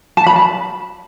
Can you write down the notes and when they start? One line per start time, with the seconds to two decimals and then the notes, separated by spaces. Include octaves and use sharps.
0.17 A5
0.26 B5
0.36 A5